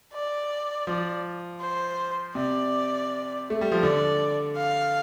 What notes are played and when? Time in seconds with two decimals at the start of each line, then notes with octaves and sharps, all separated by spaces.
0.13 D5
0.87 F3
1.60 C5
2.35 C3 D5
3.50 A3
3.61 G3
3.72 F3
3.82 D3 D5
4.57 F5